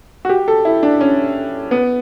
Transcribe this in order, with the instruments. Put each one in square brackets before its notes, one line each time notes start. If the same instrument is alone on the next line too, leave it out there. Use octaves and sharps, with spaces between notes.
[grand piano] F#4
G4
A4
E4
D4
C#4
B3